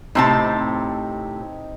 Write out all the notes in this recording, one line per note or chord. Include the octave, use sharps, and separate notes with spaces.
A2 C3 C4 D#4 A5